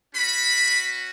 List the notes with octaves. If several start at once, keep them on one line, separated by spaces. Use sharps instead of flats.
C#4 F#4 B5